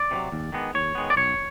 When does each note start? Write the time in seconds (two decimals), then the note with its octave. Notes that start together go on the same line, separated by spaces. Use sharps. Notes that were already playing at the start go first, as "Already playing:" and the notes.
Already playing: D5
0.11 C3 D#3
0.16 F#3
0.32 D#2
0.53 D#3 G#3 B3
0.75 D#2 C#5
0.95 D#3 G#3 B3
1.10 D5
1.16 B1 C#5